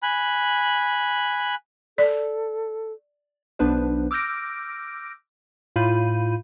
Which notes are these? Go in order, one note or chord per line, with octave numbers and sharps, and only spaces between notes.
G#5 B5 F#6
A4 D5
B1 B3 D4 B4 C5
D6 E6 F6 G6 A#6 D7
A2 F4 F5 B5 G6 D#7